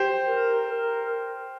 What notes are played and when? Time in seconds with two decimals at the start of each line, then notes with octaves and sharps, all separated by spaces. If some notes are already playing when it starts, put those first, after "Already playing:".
Already playing: G4 C5
0.27 A#4
0.69 A#4